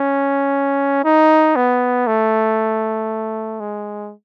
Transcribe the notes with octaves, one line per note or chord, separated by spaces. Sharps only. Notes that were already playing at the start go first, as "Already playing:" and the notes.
Already playing: C#4
D#4
B3
A3
G#3